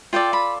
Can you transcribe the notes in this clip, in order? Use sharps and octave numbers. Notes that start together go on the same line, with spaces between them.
F4 A4 D5 G5
B5